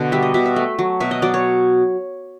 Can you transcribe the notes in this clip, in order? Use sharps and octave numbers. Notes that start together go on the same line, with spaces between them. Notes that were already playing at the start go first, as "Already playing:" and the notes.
Already playing: B2 D3
G3 E5
D#5
B2 E5
E5
A3
F#3
B2 E5
D#5
F#3 D5
C#5